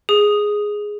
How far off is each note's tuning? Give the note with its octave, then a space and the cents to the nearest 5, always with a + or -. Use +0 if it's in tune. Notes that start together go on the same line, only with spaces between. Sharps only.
G#4 +0 D#6 +0